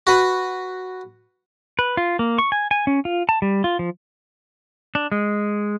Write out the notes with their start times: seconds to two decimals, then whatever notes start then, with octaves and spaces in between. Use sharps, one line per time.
0.07 F#4 B4
1.79 B4
1.97 F4
2.19 A#3
2.38 C#6
2.52 G#5
2.71 G#5
2.87 C#4
3.05 F4
3.29 A5
3.42 G3
3.64 F4
3.79 F3
4.95 D4
5.12 G#3